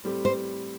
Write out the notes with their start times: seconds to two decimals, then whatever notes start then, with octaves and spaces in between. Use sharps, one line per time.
0.04 A2 G3 C4 G4
0.25 C5